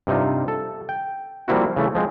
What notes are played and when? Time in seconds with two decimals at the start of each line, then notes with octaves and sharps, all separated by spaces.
0.07 G2 C3 D#4 F4
0.48 A4
0.89 G5
1.48 F3 G3 A#3 C4 E4 F#4
1.76 C#3 E3 A3
1.95 F3 G#3 C4